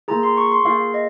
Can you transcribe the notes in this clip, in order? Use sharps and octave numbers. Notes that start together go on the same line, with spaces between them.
A#3 F4 G#4 A#5
C6
C#6
C6
A#3 F4 G#4 F5
D#5